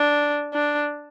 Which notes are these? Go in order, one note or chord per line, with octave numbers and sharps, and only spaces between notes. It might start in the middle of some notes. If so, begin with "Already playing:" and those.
Already playing: D4
D4